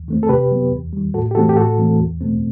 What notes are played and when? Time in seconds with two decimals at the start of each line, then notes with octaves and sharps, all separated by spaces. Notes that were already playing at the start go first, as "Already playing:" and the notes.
Already playing: E2
0.08 D#3 A3 C4
0.23 A4
0.29 C3 G4 B4
0.51 F#3 B3
0.72 E2
0.93 D#3 G3
1.14 A2 F#4 A4
1.31 G4
1.35 E3 A3 C4 F#4 A4
1.49 G4
1.56 A2 F#4 A4
1.78 E3 A3 C4
2.00 E2
2.21 B2 A3 C4